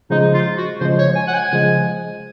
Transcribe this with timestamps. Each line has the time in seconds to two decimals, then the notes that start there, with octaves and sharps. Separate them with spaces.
0.10 C#3 F3 G#3 D#4
0.34 F4
0.57 F#4
0.81 C#3 F3 G#3 C5
0.98 C#5
1.16 G#5
1.28 F#5
1.34 G#5
1.52 C#3 F3 G#3